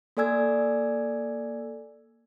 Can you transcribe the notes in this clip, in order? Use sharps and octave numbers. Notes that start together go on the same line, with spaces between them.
A#3 A4 D5 G#5 E6 G#6